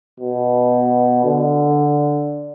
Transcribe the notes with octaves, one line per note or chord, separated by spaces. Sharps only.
B2
D3